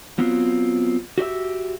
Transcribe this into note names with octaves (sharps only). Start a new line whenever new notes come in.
F#3 B3 C4 F4
F#4 G4 D5 E5